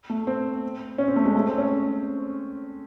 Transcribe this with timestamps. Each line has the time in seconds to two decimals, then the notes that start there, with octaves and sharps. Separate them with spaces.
0.10 A3
0.27 C4
0.98 C#4
1.08 C4
1.16 A3
1.25 G#3
1.35 A3
1.46 C4
1.58 C#4